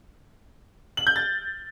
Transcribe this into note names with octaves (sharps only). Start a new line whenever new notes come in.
F#7
G6
A6